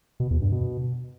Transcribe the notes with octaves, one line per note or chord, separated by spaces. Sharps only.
B2
E2
G2
B2